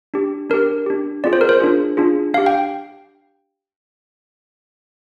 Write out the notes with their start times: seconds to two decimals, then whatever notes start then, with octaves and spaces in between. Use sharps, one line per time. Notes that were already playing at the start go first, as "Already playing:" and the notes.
0.14 D4 G4
0.50 D4 G4 A#4
0.86 D4 G4
1.24 C4 F4 G#4 D5
1.33 C5
1.41 A#4
1.49 C5
1.60 D4 F4 G#4
1.97 D4 F4 G#4
2.34 D4 G4 F5
2.46 G5